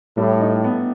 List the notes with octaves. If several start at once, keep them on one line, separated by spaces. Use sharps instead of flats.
A2 G3
D#4
B3